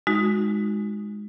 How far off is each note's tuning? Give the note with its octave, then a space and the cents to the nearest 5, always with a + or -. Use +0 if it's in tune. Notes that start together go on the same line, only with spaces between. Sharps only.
G#3 +0 D#4 +0 F#4 -15